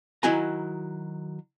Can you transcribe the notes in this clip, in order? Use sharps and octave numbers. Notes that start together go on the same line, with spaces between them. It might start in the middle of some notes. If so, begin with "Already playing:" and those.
D#3 F#3 E4 F#4 G#5 A#5